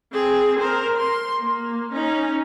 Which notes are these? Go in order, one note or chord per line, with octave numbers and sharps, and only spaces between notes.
C4 G#4
A#4 C5
C6
A#3
C#4 D#4